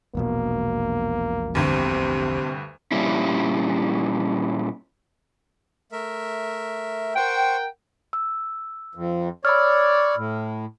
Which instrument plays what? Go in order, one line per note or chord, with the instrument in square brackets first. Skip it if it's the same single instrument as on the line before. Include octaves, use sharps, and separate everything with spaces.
[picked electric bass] E1 A#1 B2 [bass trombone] A#3
[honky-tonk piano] D2 G2 [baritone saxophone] C3
[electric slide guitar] A#2 G3 C#4 E4
[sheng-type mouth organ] A3 A#4 E5
[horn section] A#4 F#5 G5 [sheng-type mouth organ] C5 C#6
[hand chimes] E6
[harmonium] F2
[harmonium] C#5 D5 [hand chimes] B5 E6 F6
[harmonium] A2